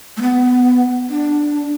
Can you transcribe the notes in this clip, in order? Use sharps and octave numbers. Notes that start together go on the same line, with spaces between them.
A3
B3
D4